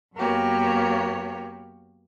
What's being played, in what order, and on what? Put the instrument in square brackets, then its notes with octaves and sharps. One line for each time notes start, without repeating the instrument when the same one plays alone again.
[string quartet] F#2 A#3 B3 F#4 G4 C#5